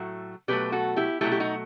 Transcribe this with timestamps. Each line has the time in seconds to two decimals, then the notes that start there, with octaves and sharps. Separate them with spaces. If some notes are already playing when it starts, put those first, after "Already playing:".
Already playing: A2 F#3 A3
0.48 B2 F#3 A3 G4 B4
0.72 F#4 A4
0.96 E4 G4
1.21 B2 F#3 A3 E4 G4
1.31 G4
1.40 D#4 F#4